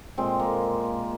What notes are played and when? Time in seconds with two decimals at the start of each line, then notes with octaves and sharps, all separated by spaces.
0.18 A#2 G#3 C4
0.40 A#3